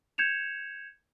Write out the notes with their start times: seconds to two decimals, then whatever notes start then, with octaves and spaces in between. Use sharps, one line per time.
0.18 G6 G#6 C#7 E7 F7